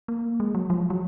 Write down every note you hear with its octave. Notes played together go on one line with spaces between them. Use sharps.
A#3
G#3
F#3
F3
F#3